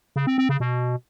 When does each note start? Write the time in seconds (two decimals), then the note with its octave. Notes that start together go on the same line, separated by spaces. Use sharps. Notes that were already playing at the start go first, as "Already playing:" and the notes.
0.16 C#3
0.27 C4
0.38 C4
0.49 C#3
0.60 B2